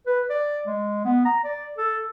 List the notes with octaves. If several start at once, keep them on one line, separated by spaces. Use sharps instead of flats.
B4
D5
G#3
B3
A#5
D5
A4